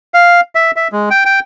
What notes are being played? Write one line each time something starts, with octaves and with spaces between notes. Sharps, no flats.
F5
E5
E5
G#3
G5
G5